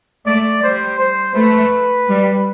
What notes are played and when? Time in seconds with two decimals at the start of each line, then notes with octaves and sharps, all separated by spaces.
0.26 A3 D5
0.63 G3 C5
0.99 C5
1.35 A3 B4
2.08 G3